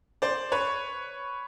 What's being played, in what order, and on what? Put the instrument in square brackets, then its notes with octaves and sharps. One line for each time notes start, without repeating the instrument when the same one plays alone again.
[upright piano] C5 D5
B4 C#5